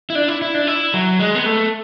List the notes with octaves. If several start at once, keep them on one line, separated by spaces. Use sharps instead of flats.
E4
D4
E4
E4
D4
E4
F#3
G#3
B3
A3